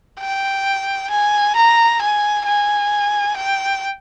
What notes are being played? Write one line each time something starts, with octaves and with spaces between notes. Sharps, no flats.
G5
G#5
A#5
G#5
G#5
G5